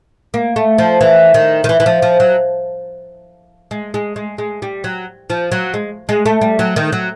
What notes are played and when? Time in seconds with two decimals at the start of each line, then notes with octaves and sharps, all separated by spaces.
0.34 A#3
0.56 A3
0.78 F3
1.01 E3
1.34 D#3
1.64 D#3
1.69 E3
1.80 E3
1.86 F3
2.02 F3
2.20 F#3
3.71 G#3
3.94 G#3
4.16 G#3
4.38 G#3
4.62 G3
4.84 F#3
5.30 F3
5.52 F#3
5.74 G#3
6.09 G#3
6.26 A3
6.41 G3
6.59 F#3
6.76 D#3
6.92 F#3